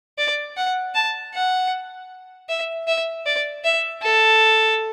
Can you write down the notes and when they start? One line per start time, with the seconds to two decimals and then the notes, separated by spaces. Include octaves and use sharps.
0.18 D5
0.57 F#5
0.95 A5
1.34 F#5
2.49 E5
2.88 E5
3.26 D5
3.64 E5
4.03 A4